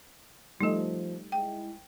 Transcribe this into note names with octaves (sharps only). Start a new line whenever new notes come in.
F3 G3 A3 D#4 G4 D#5
G#3 E4 G5